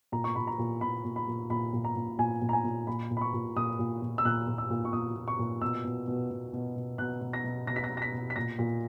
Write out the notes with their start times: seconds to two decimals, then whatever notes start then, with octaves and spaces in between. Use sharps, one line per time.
0.12 A#2 A#5
0.24 C#6
0.36 A#2 B5
0.47 A#5
0.58 A#2
0.81 A#2 B5
1.04 A#2
1.16 B5
1.28 A#2
1.50 A#2 B5
1.73 A#2
1.84 A#5
1.96 A#2
2.19 A#2 G#5
2.42 A#2
2.49 A#5
2.53 G#5
2.64 A#2
2.87 A#2 B5
3.11 A#2
3.17 B5
3.21 C#6
3.33 A#2
3.56 A#2 D#6
3.79 A#2
4.02 A#2
4.18 E6
4.25 A#2 F#6
4.47 A#2
4.58 E6
4.70 A#2
4.85 C#6
4.93 A#2 D#6
5.16 A#2
5.28 C#6
5.39 A#2
5.62 B2 E6
5.84 B2
6.08 B2
6.31 B2
6.53 B2
6.76 B2
6.98 B2 F#6
7.21 B2
7.33 A#6
7.44 B2
7.67 B2 A#6
7.76 B6
7.84 A#6
7.90 B2
7.97 A#6
8.02 B6
8.13 B2
8.30 B6
8.36 A#2 A#6
8.59 A#2